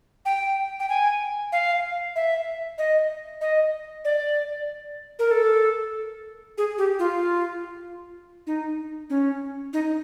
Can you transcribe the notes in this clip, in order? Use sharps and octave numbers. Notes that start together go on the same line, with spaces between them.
G5
G5
G#5
F5
E5
D#5
D#5
D5
A#4
A4
G#4
G4
F4
D#4
C#4
D#4